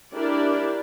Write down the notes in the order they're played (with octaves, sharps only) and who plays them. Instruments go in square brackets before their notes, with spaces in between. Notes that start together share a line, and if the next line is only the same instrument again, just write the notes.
[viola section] D4 E4 G4 A#4 D5